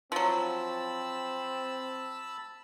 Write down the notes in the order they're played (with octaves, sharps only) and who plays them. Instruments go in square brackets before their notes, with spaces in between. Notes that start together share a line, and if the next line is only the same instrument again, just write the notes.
[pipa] F3 F#3 [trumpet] C4 [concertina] A5 B5 E6